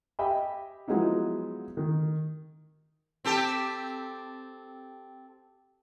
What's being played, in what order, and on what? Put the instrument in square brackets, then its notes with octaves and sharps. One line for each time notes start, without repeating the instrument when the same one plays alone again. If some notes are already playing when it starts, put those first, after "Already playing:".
[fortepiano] G4 D#5 E5 G5 G#5 B5
F3 F#3 G#3 B3 D#4 E4
D#3
[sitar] C4 G4 A4